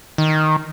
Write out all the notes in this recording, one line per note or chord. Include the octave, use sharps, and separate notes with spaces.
D#3